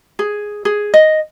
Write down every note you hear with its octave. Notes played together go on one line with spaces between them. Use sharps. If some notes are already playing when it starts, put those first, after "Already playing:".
G#4
G#4
D#5